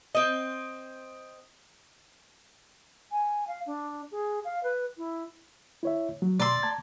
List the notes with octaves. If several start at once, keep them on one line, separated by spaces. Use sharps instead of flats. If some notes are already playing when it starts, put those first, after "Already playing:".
C4 D#5
G#5
F5
D4
G#4
F5
B4
E4
E4 C#5 E5
F#3
B2 D5 A#5 C6 E6
A5 A#5 G#6